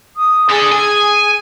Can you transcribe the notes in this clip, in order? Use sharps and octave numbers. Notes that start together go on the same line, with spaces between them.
D#6
D3 G#4 A4
G#5